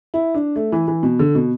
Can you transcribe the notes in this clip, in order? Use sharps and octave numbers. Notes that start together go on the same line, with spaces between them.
E4
D4
A3
E3
E3
B2
D3
B2